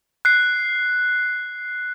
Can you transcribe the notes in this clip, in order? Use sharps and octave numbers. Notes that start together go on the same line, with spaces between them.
F#6 C7